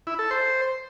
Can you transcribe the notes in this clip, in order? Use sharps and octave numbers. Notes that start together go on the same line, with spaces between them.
E4
A4
C5